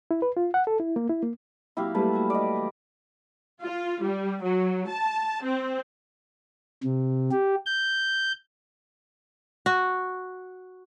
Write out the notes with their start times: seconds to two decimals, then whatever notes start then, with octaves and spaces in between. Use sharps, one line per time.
0.11 E4
0.22 B4
0.37 F4
0.54 F#5
0.67 A4
0.80 E4
0.96 A#3
1.09 E4
1.23 A#3
1.77 A#2 F#3 C4 E4 G4 F5
1.95 G3 A3 A#3 B4 A5
2.13 A#3 F#4
2.30 D5 D#5
2.56 E3
3.61 F4
4.02 G3
4.43 F#3
4.88 A5
5.44 C4
6.84 C3
7.31 G4
7.66 G6
9.66 F#4